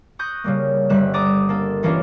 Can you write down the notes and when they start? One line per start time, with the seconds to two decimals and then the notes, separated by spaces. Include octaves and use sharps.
0.19 C#6 D#6 F#6 G6 A#6
0.44 C#3 G3 A#3
0.89 G1 G3 E5 F#6 E7
1.13 A4 D5 A#5 D6 D#6
1.49 A#3 D4 A4
1.83 E3 A#3 C#4 D4 F4